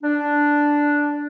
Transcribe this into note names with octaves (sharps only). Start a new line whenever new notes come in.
D4